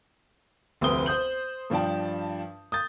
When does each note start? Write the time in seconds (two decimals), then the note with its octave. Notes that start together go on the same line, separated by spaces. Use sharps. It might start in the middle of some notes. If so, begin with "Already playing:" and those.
0.81 F1 D2 C4 B4 D#6 G7
1.06 C5 D#6 G6 F#7
1.70 G2 F3 D4 G5 A5
2.72 D#6 G6 A6